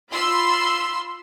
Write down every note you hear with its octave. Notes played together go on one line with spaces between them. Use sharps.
F4 B5 C6 E6